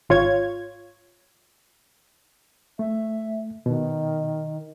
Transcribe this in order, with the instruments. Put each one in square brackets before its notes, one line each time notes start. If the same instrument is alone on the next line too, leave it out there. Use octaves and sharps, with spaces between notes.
[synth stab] G#1 F4 C#5 G#6
[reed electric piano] A3 [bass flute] E5
[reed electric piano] B2 [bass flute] D#3